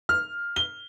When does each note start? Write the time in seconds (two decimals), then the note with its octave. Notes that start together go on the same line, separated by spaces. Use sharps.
0.09 F6
0.56 G7